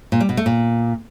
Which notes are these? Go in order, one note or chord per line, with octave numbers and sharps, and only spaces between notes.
A#2
G3
B2
A3
A#2